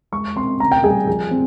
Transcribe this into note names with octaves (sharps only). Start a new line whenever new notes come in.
G#3 C#6
C4 C6
C#3 A#5
G5
G3 G#4
F3 G#4
C4